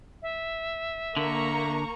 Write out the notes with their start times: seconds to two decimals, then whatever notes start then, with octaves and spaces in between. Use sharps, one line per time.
0.22 E5
1.17 D3 A#3 A#5 C#6